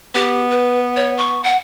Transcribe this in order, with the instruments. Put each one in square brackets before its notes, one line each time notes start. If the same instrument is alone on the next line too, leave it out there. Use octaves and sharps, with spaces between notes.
[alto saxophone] B3 [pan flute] G4
[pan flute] B4
C#5
C#6
F#5